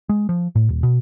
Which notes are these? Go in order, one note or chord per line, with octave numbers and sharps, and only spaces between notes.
G#3
F3
A2
D#1
B2